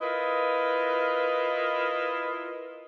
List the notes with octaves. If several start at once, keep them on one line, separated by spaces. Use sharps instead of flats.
E4 F4 A#4 B4 D#5